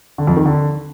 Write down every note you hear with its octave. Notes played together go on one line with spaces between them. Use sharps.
D3
F2
D#3
D3